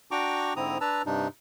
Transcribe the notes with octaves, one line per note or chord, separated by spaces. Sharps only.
D4 F#4 G5 A#5 C#6 D6
G#2 D3 C4 E4 A#5 D#6
D4 B4 A5 A#5 E6
G2 C3 D4 D#4